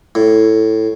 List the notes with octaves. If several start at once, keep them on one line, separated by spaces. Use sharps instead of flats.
A2